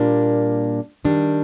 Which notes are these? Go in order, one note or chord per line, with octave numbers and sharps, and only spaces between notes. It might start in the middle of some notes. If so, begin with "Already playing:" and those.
Already playing: A#2 G3 A#3 D4
D#3 G3 D4